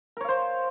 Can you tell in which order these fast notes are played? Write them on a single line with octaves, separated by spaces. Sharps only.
A#4 C#5 F5 C5